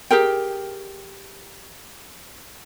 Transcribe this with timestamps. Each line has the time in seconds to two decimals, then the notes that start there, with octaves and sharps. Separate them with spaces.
0.11 G4 G#4 A#4 G5